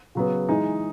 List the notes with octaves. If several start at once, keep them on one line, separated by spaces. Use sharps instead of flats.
C#3 F#3 B3
E3 G#3 D#4